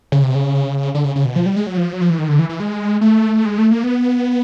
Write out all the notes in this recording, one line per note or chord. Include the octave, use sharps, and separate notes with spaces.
C#3
C3
C#3
D3
C#3
C#3
B2
F3
G3
G#3
F#3
F3
F#3
F3
E3
D#3
D3
E3
E3
G#3
A3
G#3
A3
A#3
B3